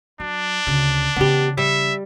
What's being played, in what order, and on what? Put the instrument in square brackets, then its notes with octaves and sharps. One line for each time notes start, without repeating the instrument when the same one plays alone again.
[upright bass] F#3 [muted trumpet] D4
[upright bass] D2 C#3
[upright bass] C#3 E3 [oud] B3 G4
[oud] G3 [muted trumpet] E5